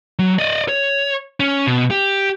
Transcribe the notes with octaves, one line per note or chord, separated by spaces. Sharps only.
F#3
D5 D#5
C#5
C#4
B2
G4